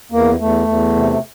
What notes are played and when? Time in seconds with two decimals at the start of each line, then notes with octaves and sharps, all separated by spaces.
0.12 E2 A#3
0.40 E2 A3
0.68 E2
0.96 C3